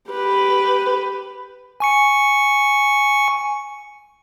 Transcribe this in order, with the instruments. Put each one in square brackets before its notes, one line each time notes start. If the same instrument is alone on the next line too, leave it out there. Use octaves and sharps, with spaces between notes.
[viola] G4 B4
[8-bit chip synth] G#5 C#6 C#7